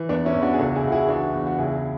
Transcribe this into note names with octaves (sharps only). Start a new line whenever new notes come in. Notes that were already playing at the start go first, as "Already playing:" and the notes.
Already playing: E3
E2 B3 D4
C#4 E4
E2
D4 F#4
G#4
C#2 F#4 A4
E4 G#4
C#2 F#4
E4 G#4
E3 D4 F#4
E2
F#4
C#2 E4 G#4